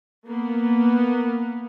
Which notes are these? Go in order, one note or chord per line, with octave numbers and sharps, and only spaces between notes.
A#3 B3